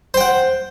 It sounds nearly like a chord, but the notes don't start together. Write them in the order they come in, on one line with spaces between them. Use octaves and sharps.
C5 G5 F#5